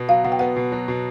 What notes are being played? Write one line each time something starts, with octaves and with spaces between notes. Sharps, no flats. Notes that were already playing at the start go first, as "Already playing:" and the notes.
Already playing: B2 B3
F#3 F5
B2 F#5
G5
B3 F#5
B2
F#3
B2